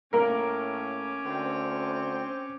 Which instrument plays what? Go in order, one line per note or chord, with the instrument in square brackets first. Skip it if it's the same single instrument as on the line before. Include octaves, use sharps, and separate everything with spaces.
[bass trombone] A2 [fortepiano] A#3 A#4 [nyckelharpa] C#4 D6
[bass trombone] D2 [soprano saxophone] C4